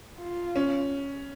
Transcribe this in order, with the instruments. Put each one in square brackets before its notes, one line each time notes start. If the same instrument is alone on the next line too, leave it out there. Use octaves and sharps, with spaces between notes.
[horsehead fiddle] F4
[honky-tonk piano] C#4